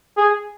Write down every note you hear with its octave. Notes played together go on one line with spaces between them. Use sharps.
G#4